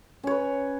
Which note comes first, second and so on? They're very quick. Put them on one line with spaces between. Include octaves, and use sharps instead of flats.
C#4 C#5 B4